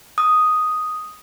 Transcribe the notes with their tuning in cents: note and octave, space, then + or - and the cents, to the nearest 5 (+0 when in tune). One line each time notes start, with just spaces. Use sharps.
D#6 +0